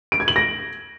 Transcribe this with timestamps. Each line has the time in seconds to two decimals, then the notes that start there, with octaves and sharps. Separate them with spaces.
0.12 D7
0.20 G#6
0.28 F#7
0.36 A#6